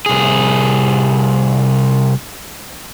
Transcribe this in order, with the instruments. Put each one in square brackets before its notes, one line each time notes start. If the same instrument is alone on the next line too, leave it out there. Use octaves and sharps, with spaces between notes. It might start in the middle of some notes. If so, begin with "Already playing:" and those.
[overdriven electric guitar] C2 G#4